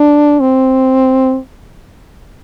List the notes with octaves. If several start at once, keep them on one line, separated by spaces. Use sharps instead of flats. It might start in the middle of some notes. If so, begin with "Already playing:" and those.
Already playing: D4
C4